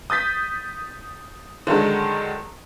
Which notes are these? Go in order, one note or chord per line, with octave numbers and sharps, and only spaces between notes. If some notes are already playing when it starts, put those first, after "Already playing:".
D#6 G6 A6 B6
D3 D#3 F#3 G#3